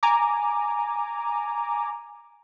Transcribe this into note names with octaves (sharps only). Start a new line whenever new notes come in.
G#5 A#5 D6